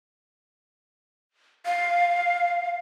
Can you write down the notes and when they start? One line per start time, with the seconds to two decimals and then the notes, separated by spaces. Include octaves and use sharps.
1.66 F5